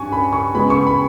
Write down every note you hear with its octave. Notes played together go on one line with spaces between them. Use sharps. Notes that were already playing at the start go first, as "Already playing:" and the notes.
Already playing: G2 G3 C#4 G#5 C#6
B5
C#6
C#3 G#3 B3 B5
C#6
B5